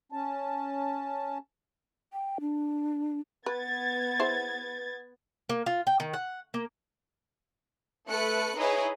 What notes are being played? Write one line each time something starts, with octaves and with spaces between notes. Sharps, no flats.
C#4 A5
G5
D4
B3 B4 G#6 A6
E4 G#4 C5
A#3
F4
G5
D#3
F#5
A#3
A3 A4 B4 F#6 C#7
D#4 E4 G#4 B4 C#5 D#5